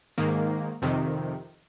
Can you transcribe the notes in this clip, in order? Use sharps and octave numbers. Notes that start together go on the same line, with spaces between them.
G#2 D#3 A#3
F2 C3 D#3